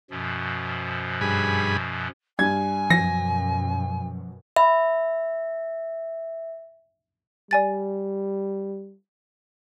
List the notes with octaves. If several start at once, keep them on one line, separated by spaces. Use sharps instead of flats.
F#2 B2 F3
G2 G#4 B5
G2 G#5 G#6
F#2 B2 F3 A#6
E5 B5
G3 D5 G#5 A6